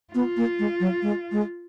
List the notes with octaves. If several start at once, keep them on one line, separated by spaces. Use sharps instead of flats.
B3 F4
A#3
G#3
F#3
G#3
G#3